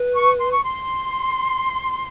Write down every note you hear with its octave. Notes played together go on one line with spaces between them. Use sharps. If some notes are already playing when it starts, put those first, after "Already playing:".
Already playing: B4
C#6
C6
C#6
C6